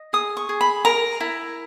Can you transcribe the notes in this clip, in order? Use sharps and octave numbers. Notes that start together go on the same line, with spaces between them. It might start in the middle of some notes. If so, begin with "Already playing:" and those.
Already playing: D#5
G#4 D#6
C#6
G#4
B5
A#4 A#5
E4